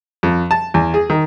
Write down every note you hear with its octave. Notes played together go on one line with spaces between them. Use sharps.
F2
A5
E2
G#4
D#3